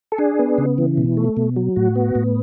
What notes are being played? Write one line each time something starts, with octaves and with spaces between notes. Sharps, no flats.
A4
D4 G#4
B3
C#3
E3
B2
A3
B2
F#3
A2 F#4
B3
A2